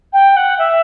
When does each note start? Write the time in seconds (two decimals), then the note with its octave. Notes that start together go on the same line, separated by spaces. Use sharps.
0.13 G5
0.36 F#5
0.58 E5